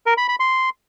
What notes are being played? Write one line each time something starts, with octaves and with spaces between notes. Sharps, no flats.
A#4
B5
B5
C6